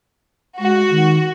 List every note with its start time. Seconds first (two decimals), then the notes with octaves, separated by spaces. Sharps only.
0.60 G#3 F#4
0.91 D#3